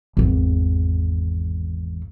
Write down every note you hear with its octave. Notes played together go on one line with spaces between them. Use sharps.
G#1 E2